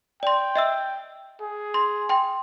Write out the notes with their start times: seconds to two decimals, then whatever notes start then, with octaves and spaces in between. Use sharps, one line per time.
0.23 D5 G5 C6
0.56 D#5 E5 E6
1.41 G#4
1.74 C6
2.09 G5 C6